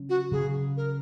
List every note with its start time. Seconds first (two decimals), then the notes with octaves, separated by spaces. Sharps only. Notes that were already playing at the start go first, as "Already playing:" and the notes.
Already playing: C#3 F#3 C#4
0.09 F#4
0.32 C#3 F#3 C#4 G#4
0.77 A#4